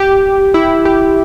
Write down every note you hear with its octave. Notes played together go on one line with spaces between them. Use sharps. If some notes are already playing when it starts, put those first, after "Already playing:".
Already playing: G4
E4
G4